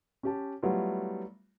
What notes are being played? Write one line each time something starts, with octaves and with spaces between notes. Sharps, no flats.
C#4 G4 A5
F#3 G3 A3 B3 E4 F4